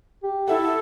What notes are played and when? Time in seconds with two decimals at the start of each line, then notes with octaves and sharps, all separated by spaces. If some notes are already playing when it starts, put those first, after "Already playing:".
0.24 G4
0.48 E4 A4 E5 F#5